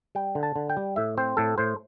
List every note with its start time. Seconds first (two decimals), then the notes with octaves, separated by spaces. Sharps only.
0.15 G3 G5
0.35 D3
0.43 A5
0.56 D3
0.70 G5
0.77 G3
0.96 A2 E5
1.18 C4 C5
1.37 A2 A4
1.58 A2 C5